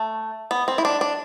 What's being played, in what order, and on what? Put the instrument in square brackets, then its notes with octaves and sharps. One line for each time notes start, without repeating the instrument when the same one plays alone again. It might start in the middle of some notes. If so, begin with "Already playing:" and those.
Already playing: [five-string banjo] A3
B3
C4
E4
D4
D4